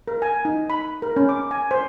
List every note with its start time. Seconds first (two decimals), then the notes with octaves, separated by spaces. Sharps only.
0.08 A#4
0.22 G#5
0.45 D#4
0.70 B5
1.02 A#4
1.16 C#4
1.29 D6
1.51 G#5
1.71 C5